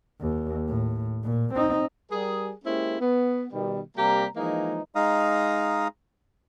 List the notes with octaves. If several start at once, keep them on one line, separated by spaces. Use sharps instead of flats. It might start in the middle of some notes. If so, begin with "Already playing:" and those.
D#2
A2
A#2
C4 D#4
G3 G#4 A#4
G#3 A#3 C#4 E4 G4 C5
B3
B2 D#3 G3
C3 G3 A#3 G4 A#5
E3 F3 G#3 A#3 D#4
G#3 D#4 F5 A#5 D#6